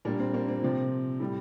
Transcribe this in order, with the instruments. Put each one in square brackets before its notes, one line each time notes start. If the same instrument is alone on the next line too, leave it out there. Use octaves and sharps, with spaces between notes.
[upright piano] A#2 G3 A#3 D4
C4
A#3 D4
C4
C3 F3
A2 G3